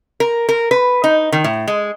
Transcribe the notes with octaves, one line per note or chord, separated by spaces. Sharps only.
A#4
A#4
B4
D#4
D#3
A2
G#3